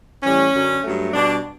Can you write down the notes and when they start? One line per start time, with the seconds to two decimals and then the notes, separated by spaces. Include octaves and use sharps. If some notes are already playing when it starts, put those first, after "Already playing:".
0.23 A2 E3 G3 C#4
0.53 F#2 D3 F#3
0.84 G2 F#3 A3
1.13 B2 G3 D4